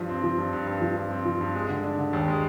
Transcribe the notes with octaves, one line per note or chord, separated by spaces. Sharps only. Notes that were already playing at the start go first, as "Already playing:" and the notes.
Already playing: G2 F3
C4
F3
G2
G2
G2
F3
G2
C4
F3
G2
G#3
D3
D4
D3
D#2
G#3